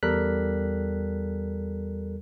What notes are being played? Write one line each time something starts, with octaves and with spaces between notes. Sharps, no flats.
E2 G3 A4 A#4 F#6 B6